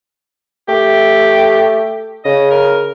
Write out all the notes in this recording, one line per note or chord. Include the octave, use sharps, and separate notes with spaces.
A3 G4
C#3 D#5
A#4